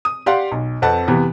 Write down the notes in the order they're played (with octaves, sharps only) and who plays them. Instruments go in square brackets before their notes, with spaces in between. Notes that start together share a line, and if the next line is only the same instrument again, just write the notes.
[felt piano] D#6
G4 D5 F5 F#5 C6
B1
F2 C4 B4 F#5 A5
C3 E3 B3